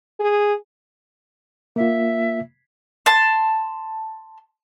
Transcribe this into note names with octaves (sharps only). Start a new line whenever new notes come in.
G#4
A#3 F4 E5
A5 C6